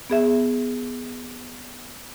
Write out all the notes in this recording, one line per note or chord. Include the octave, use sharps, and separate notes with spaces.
B3 G#4 E5